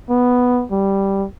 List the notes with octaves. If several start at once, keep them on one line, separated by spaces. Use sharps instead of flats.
B3
G3